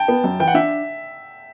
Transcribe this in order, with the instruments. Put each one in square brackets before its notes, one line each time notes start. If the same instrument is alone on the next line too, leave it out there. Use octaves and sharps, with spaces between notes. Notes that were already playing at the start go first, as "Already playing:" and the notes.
Already playing: [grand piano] G5 A5
[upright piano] B3
F#2
[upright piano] E3 [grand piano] G5
[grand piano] F#5
[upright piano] D4 [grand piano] E5